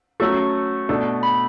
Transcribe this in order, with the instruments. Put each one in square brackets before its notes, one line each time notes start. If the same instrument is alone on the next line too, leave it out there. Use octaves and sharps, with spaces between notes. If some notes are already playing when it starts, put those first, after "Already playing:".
[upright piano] F#3 A3 C#4 F#4 A4 [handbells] C#6
[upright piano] B2 A3 D4 A4
[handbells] B5